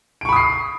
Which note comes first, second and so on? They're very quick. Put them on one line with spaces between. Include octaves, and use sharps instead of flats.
D7 C#6 B5 D#6 C7